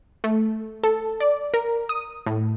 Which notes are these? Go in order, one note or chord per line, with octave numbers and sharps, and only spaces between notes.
A3
A4
D5
A#4
D#6
A2